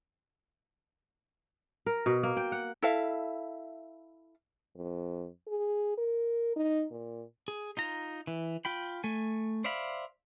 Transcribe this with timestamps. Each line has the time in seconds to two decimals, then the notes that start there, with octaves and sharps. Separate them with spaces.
1.86 A#4
2.06 B2
2.23 A#3
2.37 G5
2.52 F#5
2.82 E4 A4 E5 F5
4.76 F2
5.47 G#4
5.97 A#4
6.56 D#4
6.91 A#2
7.48 G#4
7.77 D#4 F4 A#5
8.27 E3
8.65 F4 G5 B5
9.04 A3 G#5
9.64 C5 D5 E5 F5 B5